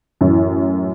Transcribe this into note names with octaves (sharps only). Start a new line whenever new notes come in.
F#2 A2 E3